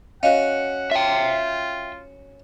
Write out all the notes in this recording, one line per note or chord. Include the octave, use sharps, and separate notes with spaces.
C#4 F#4 D#5 F5 F#5
F4 E5 G5